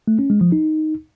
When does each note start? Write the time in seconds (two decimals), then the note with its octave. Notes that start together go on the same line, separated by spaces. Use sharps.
0.08 A3
0.19 C#4
0.30 G#3
0.41 F3
0.52 D#4